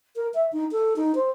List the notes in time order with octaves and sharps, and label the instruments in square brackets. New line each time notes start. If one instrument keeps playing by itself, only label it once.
[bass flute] A#4
E5
D#4
A4
D#4
C5